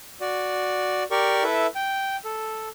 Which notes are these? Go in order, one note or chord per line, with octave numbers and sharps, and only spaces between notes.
F#4 D5
G4 A#4 D5 C#6
E4 A4 B4 E5
G5
A4